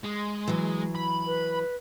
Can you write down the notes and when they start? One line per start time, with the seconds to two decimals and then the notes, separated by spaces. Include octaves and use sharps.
0.04 G#3
0.48 E3 F#3
0.95 B5
1.26 B4